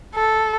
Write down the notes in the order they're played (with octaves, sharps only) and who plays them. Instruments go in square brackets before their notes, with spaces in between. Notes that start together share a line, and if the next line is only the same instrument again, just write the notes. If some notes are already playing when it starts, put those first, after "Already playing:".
[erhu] A4